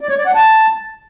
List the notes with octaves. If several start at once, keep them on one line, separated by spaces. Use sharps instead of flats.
D5
C#5
D5
F#5
A5